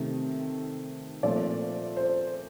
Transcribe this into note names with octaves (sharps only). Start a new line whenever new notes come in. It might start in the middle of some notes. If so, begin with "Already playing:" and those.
Already playing: C3 D#3 A3
A#2 F3 A3 C4 D5
C5